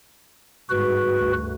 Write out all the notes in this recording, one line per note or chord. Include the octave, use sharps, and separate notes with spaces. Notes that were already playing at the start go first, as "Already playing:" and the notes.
G1 G#2 F#4 B4
D2